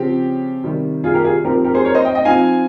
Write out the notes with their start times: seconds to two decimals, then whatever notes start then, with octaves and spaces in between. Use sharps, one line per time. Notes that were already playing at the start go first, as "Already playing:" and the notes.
Already playing: C#3 F3 C4 G4
0.64 C3 D#3 G3
1.04 F4 G#4
1.14 G4 A#4
1.24 F4 G#4
1.45 F3 C4 D#4 G4 A#4
1.64 G4 A#4
1.74 G#4 C5
1.85 A#4 C#5
1.94 C5 D#5
2.05 D#5 G5
2.15 D#5 G5
2.25 F3 C4 D#4 F5 G#5